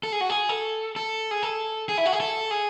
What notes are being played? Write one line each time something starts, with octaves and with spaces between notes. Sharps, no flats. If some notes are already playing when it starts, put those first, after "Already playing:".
A4
G#4
F#4
G#4
A4
A4
G#4
A4
G#4
E4
F#4
G#4
A4
G#4